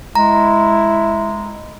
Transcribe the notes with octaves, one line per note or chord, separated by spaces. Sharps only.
G#3 E4 A#5